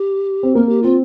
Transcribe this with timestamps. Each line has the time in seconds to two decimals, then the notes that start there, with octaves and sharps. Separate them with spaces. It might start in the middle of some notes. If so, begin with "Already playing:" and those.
Already playing: G4
0.43 C4
0.55 A#3 A#4
0.69 G4
0.82 C4 F4